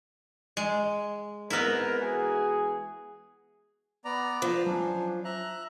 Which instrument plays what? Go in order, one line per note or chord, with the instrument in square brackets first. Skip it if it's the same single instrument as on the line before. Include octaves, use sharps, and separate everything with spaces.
[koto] G#3
[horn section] G#2 C4 A#4 [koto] B3 E4
[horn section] E3 F#4 G#4
[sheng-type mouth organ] B3 D5 A#5
[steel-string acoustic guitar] F3
[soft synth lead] F#3 [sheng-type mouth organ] C#4 D4
[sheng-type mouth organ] E5 A#5 F#6